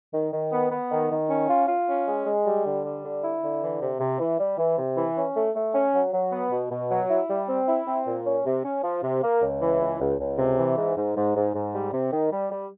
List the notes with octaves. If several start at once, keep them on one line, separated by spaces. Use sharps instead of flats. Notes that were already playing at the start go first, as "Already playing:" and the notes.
D#3
D#3
B3
B3
D#3
D#3
C#4
F4
F4
C#4
G#3
G#3
G3
D3
G3
D3
E4
D3
E3
C3
C3
E3
G3
E3
C3
E3
C#4
A3
A3
C#4
F#3
F#3
B3
B2
B2
F#3
E4
G3
C4
E4
C4
A#2
C#4
C3
C#4
F3
C3
A#3
C#2
E3
C#2
C#2
C#2
C3
E3
G#2
G#2
G#2
G#2
G#2
G3
C3
D#3
G3
G3